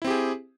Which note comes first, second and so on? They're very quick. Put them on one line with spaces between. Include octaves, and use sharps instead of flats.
E4 C4 G4 G#4